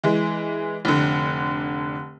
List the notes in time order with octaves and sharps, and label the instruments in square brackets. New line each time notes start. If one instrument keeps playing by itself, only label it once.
[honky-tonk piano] E3 G#3
F1 D3